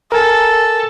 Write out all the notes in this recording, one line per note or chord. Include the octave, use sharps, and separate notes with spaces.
A4 A#4 G#5